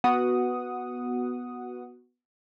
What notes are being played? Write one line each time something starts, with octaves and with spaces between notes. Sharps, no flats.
B3 F#4 F#5 D#6